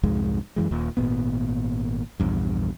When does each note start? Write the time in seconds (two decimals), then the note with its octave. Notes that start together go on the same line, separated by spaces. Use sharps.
0.03 C2 F2 G#2 G#3
0.56 F#2 E3 G#3
0.71 D#1 D#2 A#2
0.97 G#1 A#2 B3
2.20 A#1 E2 G2